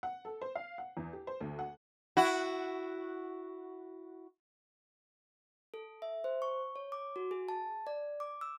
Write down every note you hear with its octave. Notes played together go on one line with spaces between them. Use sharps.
F#5
A4
C5
F5
F#5
E2
G4
C5
D2
F#5
E4 F#4
A4
E5
C5
C#6
C#5
D6
F#4
G#4
A5
D5
D6
E6